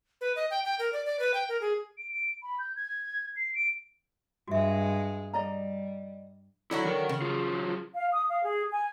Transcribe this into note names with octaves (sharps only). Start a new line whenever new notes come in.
B4
D#5
G5
G5
A#4
D5
D5
B4
G5
A#4
G#4
D7
D7
B5
G6
G#6
C7
D7
G2 G#3 F#4 E5
G3 D5 D#5 A#5
D3 F#3 E4 F#4
D#3 A#4
C#3
F#3 F4
F5
D#6
F5
G#4
G#5